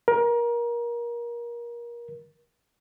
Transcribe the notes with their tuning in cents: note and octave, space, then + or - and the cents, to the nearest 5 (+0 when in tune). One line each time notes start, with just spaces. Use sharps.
A#4 +25